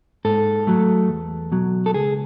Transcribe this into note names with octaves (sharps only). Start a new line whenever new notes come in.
G#2 A4
F#3 A3
E2
B2 F#3
A4
C#2 G#4